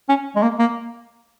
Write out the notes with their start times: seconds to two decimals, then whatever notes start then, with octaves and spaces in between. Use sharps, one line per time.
0.09 C#4
0.36 G#3
0.43 A#3
0.59 A#3